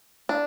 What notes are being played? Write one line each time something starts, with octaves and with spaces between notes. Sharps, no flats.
D4